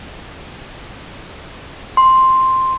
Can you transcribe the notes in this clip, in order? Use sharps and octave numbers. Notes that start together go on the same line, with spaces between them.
C6